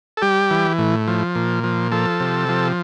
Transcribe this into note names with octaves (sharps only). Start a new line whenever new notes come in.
A4
G3 G4
E3
A2
F3
A#2
F3
F3 A4
C3
F3